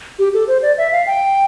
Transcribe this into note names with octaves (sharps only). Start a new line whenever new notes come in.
G4
A4
C5
D5
E5
F5
G5